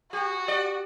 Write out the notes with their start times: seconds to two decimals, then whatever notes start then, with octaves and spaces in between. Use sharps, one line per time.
0.13 F#4 G4
0.48 D5